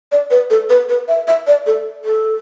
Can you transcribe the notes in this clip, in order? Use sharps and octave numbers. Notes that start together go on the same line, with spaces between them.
D5
B4
A4
B4
B4
E5
E5
D5
A4
A4